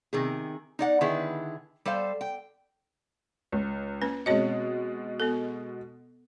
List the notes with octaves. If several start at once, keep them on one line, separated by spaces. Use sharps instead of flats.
C3 D#3 G#4
D#4 D5 F#5
D3 D#3 B3 E4 G#4 B4
G3 A4 C5 F5
G5
C#2
A#3 C#4 B4
B2 G#3 C4 C#5 D#5
B3 A4